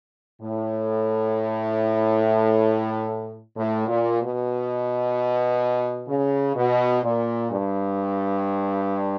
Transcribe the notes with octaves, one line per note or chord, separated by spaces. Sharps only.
A2
A2
A#2
B2
C#3
B2
A#2
G2